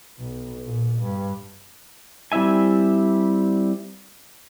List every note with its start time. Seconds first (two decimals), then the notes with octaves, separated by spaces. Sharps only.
0.18 B1
0.65 A#2
1.00 G2
2.32 G3 C4 E4 E5 G#5